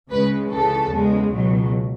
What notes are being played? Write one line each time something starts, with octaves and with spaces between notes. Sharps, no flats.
C#2 C#3 G#3 B4
C#2 C#3 E3 A4
E2 C#3 G#3
C#2 B2 F#3